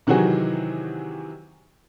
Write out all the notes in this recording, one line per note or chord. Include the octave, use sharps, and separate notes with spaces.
C3 D#3 E3 F#3 F#4 G#4